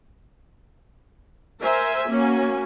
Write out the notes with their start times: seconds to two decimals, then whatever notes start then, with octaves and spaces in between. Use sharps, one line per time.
1.60 A#4 C5 E5 G#5
2.10 A#3 C#4 F#4 G#5